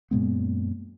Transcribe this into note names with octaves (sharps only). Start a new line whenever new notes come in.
F#2 A#2 G#3 B3